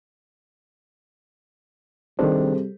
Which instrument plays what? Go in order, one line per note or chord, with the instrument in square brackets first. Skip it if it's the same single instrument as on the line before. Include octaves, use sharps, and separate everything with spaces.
[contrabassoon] C3 [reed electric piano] D#3 D4 [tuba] G3 [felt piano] G#4 A4 C5